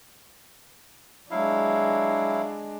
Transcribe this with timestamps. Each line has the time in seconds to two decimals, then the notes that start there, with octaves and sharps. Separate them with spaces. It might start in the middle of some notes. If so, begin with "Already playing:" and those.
1.31 F#3 G#3 D4 E4 F5